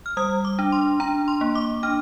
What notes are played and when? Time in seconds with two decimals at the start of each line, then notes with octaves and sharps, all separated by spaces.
0.06 F6
0.17 G3 D#6
0.45 D6
0.59 D4
0.72 C6
1.00 D4 A#5
1.28 C6
1.41 A#3
1.55 D6
1.83 D4 F6